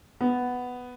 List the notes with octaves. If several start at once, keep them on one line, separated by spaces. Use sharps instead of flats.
B3